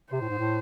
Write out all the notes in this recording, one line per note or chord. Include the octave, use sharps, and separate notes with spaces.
C3 C5
A2
G#2
A2